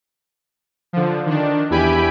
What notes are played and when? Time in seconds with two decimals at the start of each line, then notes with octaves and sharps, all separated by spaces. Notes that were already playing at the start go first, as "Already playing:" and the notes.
0.93 D3 F3
1.26 D#3 D4
1.70 E2 E4 G4 G#5 B5 D7